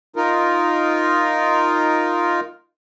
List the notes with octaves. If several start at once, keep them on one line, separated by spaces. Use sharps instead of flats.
D#4 F4 A#4